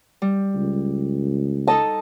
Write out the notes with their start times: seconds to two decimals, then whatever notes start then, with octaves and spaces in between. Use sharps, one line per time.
0.22 G3
0.55 C#2
1.67 D#4 A4 D#5 A5